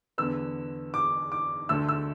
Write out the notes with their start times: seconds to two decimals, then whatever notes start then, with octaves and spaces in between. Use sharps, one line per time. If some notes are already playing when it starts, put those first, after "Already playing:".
0.18 E2 D3 B3 E6
0.94 D6
1.32 D6
1.69 D2 D3 A3 E6
1.89 E6